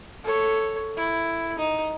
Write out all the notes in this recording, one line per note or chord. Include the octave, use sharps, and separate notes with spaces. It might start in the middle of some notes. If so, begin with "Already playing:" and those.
A4 C#5
E4
D#4